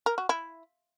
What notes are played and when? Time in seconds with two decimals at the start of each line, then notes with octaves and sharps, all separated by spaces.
0.06 A#4
0.18 F#4
0.29 E4